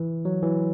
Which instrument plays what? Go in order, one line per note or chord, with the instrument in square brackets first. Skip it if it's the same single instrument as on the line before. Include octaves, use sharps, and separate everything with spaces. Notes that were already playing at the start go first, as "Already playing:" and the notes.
Already playing: [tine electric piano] E3
F#3
E3